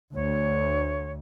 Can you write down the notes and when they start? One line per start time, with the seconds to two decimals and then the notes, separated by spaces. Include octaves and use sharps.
0.14 D2 C#5